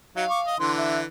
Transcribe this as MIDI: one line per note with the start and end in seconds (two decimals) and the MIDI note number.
0.16 0.24 54
0.16 0.24 63
0.16 0.58 77
0.29 0.40 85
0.29 0.40 86
0.47 0.56 75
0.59 1.05 50
0.59 1.05 52
0.59 0.72 84
0.78 1.00 76